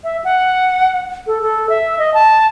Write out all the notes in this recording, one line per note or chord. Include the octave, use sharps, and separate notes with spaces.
E5
F#5
A4
A4
E5
D#5
A5